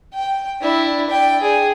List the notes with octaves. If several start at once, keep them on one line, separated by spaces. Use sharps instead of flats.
G5
D4 E4
D5 G5
G#4